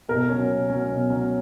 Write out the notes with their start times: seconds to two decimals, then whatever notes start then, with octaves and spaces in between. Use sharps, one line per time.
0.09 B2 A#4
0.29 F#3 C#4
0.49 B2
0.70 F#3 C#4
0.89 B2
1.10 F#3 C#4